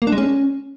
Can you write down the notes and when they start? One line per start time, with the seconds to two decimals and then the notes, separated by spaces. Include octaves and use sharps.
0.02 A#3
0.07 D4
0.12 G#3
0.18 C#4